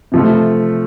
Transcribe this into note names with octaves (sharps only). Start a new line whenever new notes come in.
C3 F3 A3